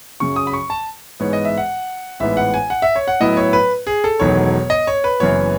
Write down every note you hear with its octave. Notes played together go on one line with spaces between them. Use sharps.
F#2 C#3 F#3 C#4 C#6
D#6
B5
C#6
A5
G#2 E3 G#3 B3 C#5
D#5
E5
F#5
A1 G#2 E3 B3 E5
F#5
G#5
F#5
E5
C#5
F#5
A2 F#3 B3 E4 D#5
C#5
B4
G#4
A4
E1 E2 D#3 F#3 A3 C#5
D#5
C#5
B4
F#1 F#2 E3 B3 C#5